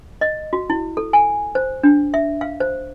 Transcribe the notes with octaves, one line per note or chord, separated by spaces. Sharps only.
D#5
F#4
E4
A4
G#5
C5
D4
E5
F5
C5